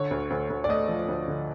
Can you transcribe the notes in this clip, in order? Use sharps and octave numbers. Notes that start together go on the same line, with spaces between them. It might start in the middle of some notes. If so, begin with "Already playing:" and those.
Already playing: D3 C#5
D2
D2
D2
D5
A3 D#5
F3
D2
D3